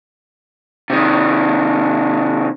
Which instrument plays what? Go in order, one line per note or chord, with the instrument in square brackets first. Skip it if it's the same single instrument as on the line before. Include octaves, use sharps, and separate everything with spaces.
[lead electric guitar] C3 D#3